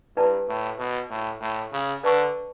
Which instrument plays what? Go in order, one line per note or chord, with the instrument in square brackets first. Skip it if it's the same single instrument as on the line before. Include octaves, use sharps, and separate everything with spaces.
[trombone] G2 [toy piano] E4 B4 D5 A5
[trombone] A2
B2
A2
A2
C#3
[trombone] D3 [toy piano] B4 D5 A5 C#6